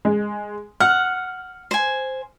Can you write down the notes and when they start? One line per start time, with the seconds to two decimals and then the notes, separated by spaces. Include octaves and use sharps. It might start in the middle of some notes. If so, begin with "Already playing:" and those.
0.05 G#3
0.80 F#5 F6
1.71 C5 G#5